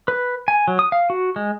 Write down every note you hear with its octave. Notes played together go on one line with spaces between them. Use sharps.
B4
G#5
F#3
D#6
F5
F#4
G#3